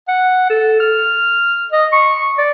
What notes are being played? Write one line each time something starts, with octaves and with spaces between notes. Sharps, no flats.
F#5
A4
F6
D#5
C#6
D5